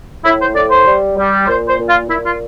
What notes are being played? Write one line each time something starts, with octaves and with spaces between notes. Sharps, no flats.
A2 E4
C5
A2 D5
C5
G3
G3
A#2 C5
C5
A#2
F4
A#2 E4
F4